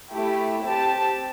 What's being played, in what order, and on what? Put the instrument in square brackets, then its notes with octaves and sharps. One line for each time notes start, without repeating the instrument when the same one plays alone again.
[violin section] A3 E4 G4
C4 G4 A5